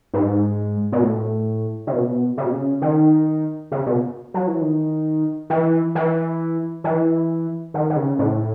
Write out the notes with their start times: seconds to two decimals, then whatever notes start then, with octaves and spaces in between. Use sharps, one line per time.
0.14 G#2
0.92 B2
1.03 A2
1.87 C#3
1.93 B2
2.37 C#3
2.45 B2
2.53 C#3
2.82 D#3
3.72 C#3
3.86 B2
4.34 F#3
4.48 E3
4.61 D#3
5.50 E3
5.95 E3
6.84 E3
7.74 D#3
7.90 D#3
7.97 C#3
8.19 A2